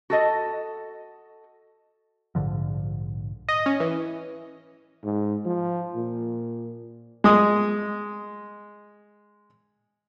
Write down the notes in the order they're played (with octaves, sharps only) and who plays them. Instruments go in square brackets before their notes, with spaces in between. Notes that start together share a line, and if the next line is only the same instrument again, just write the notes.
[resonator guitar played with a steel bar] F#4 A4 D#5
[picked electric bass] A#1 G#2 D3 F3
[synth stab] D#5
C#4
E3
[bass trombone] G#2
F3
A#2
[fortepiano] G#3 D#6